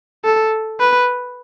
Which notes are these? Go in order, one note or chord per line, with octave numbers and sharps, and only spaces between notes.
A4
B4